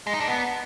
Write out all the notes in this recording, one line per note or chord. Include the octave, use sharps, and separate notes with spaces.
G#3
D#4
D4
B3